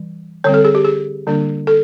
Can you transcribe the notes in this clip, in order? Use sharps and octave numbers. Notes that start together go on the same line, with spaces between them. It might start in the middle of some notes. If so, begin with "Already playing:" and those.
Already playing: E3 G3
D3 G3 C4 C#5
A4
G#4
G4
G#4
D3 G3 A#3 D4
A4